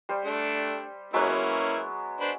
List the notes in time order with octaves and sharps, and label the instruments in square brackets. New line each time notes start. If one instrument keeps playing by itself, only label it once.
[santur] G3 C5
[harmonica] A3 D4
[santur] F#3 G#3 B3 [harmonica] A#3 C#4 E4
[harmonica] D4 B4 C5